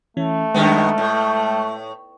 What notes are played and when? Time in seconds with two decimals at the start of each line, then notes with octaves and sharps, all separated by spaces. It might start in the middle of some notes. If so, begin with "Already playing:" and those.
0.17 E3 A3 C#4
0.54 F#2 D#3 G#3 B3 F6
0.98 A2